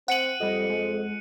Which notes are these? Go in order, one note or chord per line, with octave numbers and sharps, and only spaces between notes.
C4 F#5 F#6 C#7 D#7 F#7
F2 G3 D#5
G#3